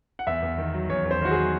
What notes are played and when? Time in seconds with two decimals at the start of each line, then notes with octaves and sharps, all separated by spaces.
0.19 F#5
0.27 E2 E5
0.42 E2
0.58 D#3
0.74 F#3
0.89 E2 C#5
1.05 E2
1.11 C5
1.21 D#3 F#4
1.31 G#4
1.37 F#3